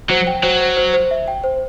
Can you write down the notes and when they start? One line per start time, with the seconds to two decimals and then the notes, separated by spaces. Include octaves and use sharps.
0.10 F#3 C5
0.27 G5
0.43 F#3 C5
0.61 C5
0.77 C5
0.93 C5
1.11 E5
1.28 G5
1.44 C5